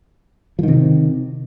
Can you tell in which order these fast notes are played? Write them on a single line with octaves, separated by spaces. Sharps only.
F3 D#3 C3